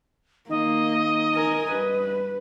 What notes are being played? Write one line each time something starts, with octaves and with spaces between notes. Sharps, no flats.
D#3 A#3 D#5
A#4 G#5
G2 B4